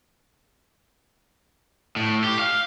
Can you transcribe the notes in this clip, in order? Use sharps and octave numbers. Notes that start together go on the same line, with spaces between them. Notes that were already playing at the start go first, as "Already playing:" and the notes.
A2
G4
F5